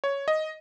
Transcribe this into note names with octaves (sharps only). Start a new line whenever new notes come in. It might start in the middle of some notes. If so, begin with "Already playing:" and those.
C#5
D#5